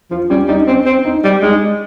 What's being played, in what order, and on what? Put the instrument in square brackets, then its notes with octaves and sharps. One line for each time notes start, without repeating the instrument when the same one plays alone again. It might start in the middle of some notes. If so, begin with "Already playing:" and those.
[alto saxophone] F3 [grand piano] F4
[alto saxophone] G3 [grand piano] C#4
[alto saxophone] G3 [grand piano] D#4
[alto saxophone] C4 [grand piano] C#4
[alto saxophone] C4
[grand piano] D#4
[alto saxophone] G3
[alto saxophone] G#3 [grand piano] D#4